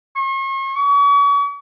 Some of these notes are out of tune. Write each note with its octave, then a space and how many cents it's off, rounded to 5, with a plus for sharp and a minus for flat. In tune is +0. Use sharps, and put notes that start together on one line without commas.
C#6 -45
C#6 +40